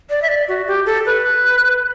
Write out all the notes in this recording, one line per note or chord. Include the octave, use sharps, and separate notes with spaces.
D5
E5
D5
F#4
G4
A4
B4